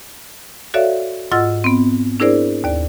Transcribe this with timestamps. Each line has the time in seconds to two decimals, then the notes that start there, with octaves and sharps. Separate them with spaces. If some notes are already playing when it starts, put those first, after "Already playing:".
0.74 F#4 A4 C#5 D5 E5 F5
1.32 G#2 F4 D#5 F#5 E6 A6
1.64 B3 C4
2.20 D4 E4 G#4 A#4 C5 D5
2.64 D#2 D5